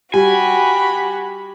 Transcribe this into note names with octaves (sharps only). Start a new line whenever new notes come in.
G3 F#4 G4 G#5 B5